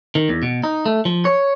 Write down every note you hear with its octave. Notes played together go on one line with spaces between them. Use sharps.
D#3
E2
B2
D#4
A3
F3
C#5